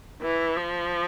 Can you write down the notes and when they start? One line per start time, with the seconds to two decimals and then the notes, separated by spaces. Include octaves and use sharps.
0.22 E3
0.57 F3